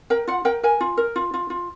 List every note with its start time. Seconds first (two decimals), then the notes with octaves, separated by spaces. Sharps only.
0.10 A#4 G5
0.27 F4 F#5
0.45 A#4 G5
0.63 A#4 G#5
0.81 F4
0.97 A#4
1.16 F4
1.34 F4
1.50 F4